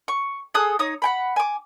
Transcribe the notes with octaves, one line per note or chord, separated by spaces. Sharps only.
C#6
G#4 A4 D#6 F#6
D#4 C#5 D#6
F#5 G5 B5
G#5 D6